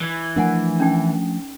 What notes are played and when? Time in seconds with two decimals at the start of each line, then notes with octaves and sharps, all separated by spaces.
0.01 E3
0.36 F3 A3 D4 A#4 F#5 G#5
0.80 C#4 D#4 G5